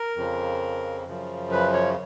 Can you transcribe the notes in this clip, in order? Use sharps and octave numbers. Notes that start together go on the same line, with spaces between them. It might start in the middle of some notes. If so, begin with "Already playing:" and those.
Already playing: A#4
F2 C#3 F3
F#2 C#3 F3
B4
C#5